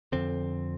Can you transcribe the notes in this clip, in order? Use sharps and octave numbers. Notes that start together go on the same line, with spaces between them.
F2 D3 C4